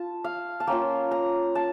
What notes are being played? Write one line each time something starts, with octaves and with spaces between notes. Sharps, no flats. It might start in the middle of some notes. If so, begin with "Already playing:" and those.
Already playing: F4 A5
F5
A5
A#3 C#4 F4 G5
A#5
A5